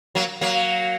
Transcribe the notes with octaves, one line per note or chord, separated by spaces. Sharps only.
F#3 A#3
F#3 A#3